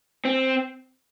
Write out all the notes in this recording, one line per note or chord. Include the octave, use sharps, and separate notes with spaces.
C4